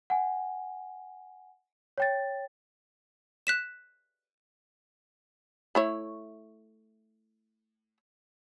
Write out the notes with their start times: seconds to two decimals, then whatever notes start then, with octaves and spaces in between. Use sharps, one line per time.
0.10 F#5 G#5
1.98 C#5 G5 A6
3.47 F#6 B6 E7
5.75 A3 E4 C#5